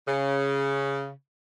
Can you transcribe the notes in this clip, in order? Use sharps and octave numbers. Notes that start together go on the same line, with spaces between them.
C#3